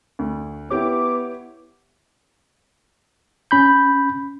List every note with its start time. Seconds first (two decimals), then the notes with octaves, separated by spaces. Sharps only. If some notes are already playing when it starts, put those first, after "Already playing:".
0.19 D2
0.70 B3 E4 G4 C#5 D6
3.51 C#4 B5 G6